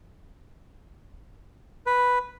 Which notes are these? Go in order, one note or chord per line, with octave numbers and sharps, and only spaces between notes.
B4